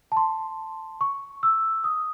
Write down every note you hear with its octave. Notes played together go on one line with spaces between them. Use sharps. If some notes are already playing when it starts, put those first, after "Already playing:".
A5
C6
C#6
E6
D#6